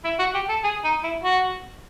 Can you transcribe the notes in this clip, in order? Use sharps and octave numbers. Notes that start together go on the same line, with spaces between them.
E4
F#4
G4
A4
G#4
D#4
E4
F#4